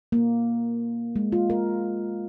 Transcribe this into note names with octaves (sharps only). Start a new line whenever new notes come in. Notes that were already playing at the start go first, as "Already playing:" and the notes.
A#3
G#3
F4
A#4